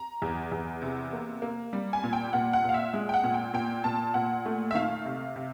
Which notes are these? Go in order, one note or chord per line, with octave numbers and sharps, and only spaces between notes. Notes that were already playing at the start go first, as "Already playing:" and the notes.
Already playing: A#5
E2
E2
C3
A#3
A#3
G3
G#5
A#2
G5
A#2 F#5
F#5
A#2 F5
E5
G#3
G5
F#5
A#2
G5
A#2 G5
A#2 A5
A#2 F#5
A3
E5
D#3 F5
C3
C3